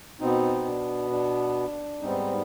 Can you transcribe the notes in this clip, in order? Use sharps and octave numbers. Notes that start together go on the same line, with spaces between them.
B2 B3 C4 D#4
D4
D4
G#2 G3 B3 C4 D#4